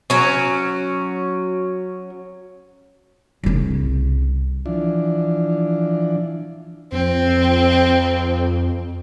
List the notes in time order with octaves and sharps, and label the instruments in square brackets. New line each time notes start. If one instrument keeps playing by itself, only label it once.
[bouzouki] F#3 C#4
[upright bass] C2 C#3
[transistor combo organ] E3 F3 D4
[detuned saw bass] F2 [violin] C4